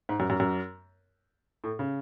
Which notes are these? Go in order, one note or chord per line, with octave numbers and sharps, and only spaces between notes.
G#2
F#2
F#2
F#2
A2
C#3